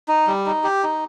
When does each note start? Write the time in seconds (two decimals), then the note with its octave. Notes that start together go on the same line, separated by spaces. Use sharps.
0.08 D#4
0.27 G3
0.46 D#4
0.64 G4
0.83 D#4